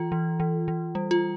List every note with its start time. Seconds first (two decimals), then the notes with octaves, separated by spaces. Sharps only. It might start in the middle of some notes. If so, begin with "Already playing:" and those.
Already playing: E3 F4
0.12 E3
0.40 E3
0.68 E3
0.95 G3
1.11 F4